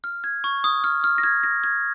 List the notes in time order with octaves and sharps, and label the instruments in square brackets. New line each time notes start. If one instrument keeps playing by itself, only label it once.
[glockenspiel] F6
G#6
C#6
D#6
F6
F6
A#6
G#6
A#6
G#6